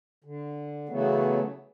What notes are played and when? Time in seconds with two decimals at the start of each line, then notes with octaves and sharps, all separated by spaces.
0.24 D3
0.89 C#3 E3 F#3 A3 B3